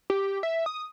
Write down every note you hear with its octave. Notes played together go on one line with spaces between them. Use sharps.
G4
E5
D#6